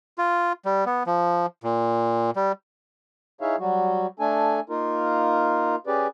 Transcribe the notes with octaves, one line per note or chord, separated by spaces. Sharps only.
F4
G3
B3
F3
A#2
G3
D#4 E4 G#4 C#5 E5 F5
F#3 G3 F#4
A3 D4 A4 G#5
A#3 D#4 F4 A#4
C#4 G4 G#4 B4 D5